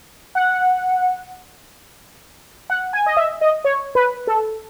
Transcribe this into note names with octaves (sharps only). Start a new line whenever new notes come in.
F#5
F#5
G#5
D#5
E5
D#5
C#5
B4
A4